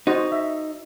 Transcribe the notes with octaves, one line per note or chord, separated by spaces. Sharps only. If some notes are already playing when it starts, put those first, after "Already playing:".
D#4 F#4 C5
E5